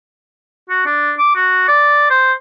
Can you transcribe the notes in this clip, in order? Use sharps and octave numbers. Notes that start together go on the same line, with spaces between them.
F#4
D4
D6
F#4
D5
C5